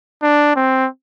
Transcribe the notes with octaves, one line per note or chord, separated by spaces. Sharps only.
D4
C4